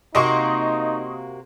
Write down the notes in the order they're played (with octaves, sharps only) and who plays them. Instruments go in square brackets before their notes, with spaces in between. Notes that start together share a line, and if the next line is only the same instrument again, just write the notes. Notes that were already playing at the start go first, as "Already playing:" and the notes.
[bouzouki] C3 A#3 F#4 [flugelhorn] D#4 [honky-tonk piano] D#5 C6 C#6